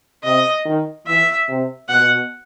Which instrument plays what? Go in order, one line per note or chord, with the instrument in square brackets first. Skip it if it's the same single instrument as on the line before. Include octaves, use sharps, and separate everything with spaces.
[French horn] C3 [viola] D#5
[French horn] D#3
[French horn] E3 [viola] E5
[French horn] C3
[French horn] B2 [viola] F#5